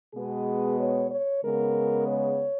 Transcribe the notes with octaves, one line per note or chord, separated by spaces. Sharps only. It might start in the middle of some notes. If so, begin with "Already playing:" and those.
B2 G#3 B3 G#4
C#5
C#5
C#3 G#3 B3 A#4
C#5